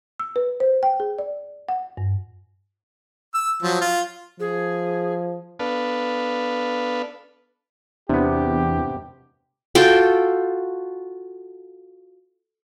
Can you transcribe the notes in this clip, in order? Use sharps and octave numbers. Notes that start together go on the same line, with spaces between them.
E6
B4
C5
G5
G#4
D5
F#5
G2
E6
F3 F#3
F4
F3 G#4
B3 D4 A4 B4 F5
E2 C3 B3 D4 G4
F4 F#4 A4 G5